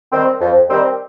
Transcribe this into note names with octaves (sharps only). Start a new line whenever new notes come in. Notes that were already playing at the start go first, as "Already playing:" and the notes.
D#3 G3 C4
F2
D#3 G3 C4